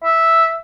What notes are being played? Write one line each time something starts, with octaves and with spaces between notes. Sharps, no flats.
E5